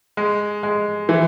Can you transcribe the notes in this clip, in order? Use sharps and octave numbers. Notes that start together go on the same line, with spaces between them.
G#3
G#3
E3